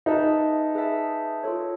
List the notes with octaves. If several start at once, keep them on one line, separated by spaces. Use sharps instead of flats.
D#4 G#4 B4 E5 A5
G#4 B4 E5 A5
F4 A4 C#5